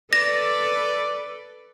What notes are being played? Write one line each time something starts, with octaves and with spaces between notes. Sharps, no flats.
A4 B4 D5 A#6